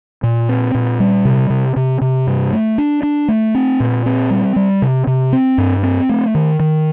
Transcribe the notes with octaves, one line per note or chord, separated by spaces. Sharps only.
A#2
C4
A#2
G3
C3
C3
C3
C3
G2
A3
D4
D4
A3
C4
A#2
C4
G3
G3
C3
C3
C4
G2
C4
A3
D#3
D#3